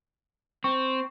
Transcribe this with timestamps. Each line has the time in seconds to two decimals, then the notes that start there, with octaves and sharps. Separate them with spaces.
0.64 C4 C#6